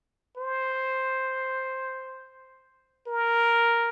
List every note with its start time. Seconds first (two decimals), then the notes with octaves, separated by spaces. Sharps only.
0.38 C5
3.08 A#4